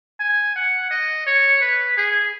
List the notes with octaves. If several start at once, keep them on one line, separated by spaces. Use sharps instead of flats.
G#5
F#5
D#5
C#5
B4
G#4